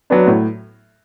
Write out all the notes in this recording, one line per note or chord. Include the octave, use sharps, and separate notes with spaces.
F#3 B3 D4
A2